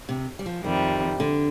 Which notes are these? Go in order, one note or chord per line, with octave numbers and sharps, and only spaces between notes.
C3
G3
F3
F2 C3 D#3 G3
D3